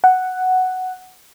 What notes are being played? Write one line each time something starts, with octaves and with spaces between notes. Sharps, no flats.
F#5